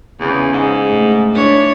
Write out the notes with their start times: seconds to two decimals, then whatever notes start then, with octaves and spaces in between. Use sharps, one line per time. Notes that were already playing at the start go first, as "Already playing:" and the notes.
0.20 E2 C#3
0.52 G#2
0.87 A2
1.35 D4 E4 C#5